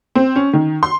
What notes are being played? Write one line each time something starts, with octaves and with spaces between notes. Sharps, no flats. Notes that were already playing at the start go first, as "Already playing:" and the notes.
C4
C#4
D#3
C6